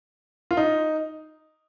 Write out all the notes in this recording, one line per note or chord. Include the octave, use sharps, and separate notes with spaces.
F4
D#4